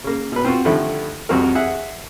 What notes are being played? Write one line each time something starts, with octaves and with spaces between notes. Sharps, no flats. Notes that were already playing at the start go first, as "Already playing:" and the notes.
C#3 A#3
B2 B4
C4 F4 F#4
D3 D#3 F3 G3 A3 E4
C2 F2 F#4 A#4
G#4 E5 F#5